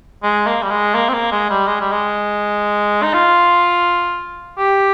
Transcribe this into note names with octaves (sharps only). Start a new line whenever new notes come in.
G#3
A#3
G3
G#3
A#3
C4
A#3
G#3
G3
G#3
G3
G#3
D#4
F4
G4